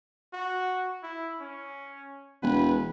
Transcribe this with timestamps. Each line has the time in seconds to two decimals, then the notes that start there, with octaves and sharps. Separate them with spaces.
0.33 F#4
1.03 E4
1.40 C#4
2.43 E1 B4